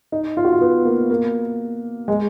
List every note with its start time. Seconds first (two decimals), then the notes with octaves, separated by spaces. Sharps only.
0.12 D#4
0.37 F4
0.45 F#4
0.52 F4
0.61 B3
0.85 A#3
1.10 A#3
2.08 G#3